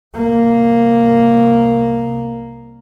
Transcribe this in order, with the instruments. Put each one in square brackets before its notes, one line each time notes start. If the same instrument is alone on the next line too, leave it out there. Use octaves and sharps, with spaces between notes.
[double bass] C2 A#3